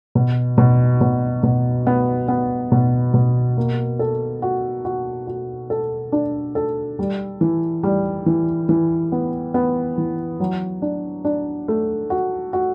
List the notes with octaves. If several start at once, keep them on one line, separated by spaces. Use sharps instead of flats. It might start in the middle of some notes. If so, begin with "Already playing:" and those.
B2
B2
B2
B2
B3
B3
B2
B2
A#3
A4
F#4
F#4
F#4
A4
D4
A4
G3
E3
G3
E3
E3
B3
B3
E3
F#3
D4
D4
A3
F#4
F#4